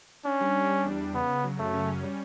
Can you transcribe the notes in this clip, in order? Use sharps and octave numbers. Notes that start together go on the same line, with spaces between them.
C#4 D4
G3
D4
G3
E2
E2
C#3 B3
C#3
F#3
F#2 A3
C#4
C#4
G3